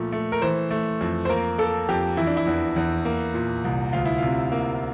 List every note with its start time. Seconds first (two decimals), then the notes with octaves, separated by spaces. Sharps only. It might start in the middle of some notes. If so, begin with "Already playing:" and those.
Already playing: A#2 F3 A3
0.12 A3
0.32 A#4
0.42 E3 C5
0.71 A3
1.01 F2
1.25 C5
1.29 A#3 A#4
1.58 A#3 A4
1.89 F2 G4
2.17 E3 E4
2.27 D4
2.37 E4
2.47 E2
2.76 E2
3.05 A#3
3.34 A#2
3.64 C2
3.93 D2 F4
4.05 E4
4.18 C3 F4
4.52 A#3